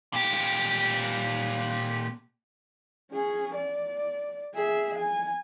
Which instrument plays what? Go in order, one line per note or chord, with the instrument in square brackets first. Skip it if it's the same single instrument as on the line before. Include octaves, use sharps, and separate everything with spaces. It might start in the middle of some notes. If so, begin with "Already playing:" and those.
[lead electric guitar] A#2 G4
[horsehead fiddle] C#4 G#4
D5
G#4 E5
G#5